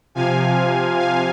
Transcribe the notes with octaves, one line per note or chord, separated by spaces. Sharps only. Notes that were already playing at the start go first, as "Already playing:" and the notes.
C3 F3 F5 G#5
F5 G#5